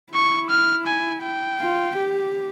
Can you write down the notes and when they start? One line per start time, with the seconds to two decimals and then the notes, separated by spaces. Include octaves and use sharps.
0.13 E4 C#6
0.50 F6
0.87 G#5
1.23 G5
1.60 F4
1.96 G4